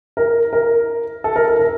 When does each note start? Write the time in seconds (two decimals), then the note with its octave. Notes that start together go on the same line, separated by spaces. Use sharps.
0.17 A#4
0.53 A#4
1.24 A4
1.36 A#4
1.48 A#4
1.59 A#4